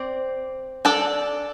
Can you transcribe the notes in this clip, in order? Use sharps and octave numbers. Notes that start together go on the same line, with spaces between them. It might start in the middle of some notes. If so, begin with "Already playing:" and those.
Already playing: C4 D5
D4 A4 D5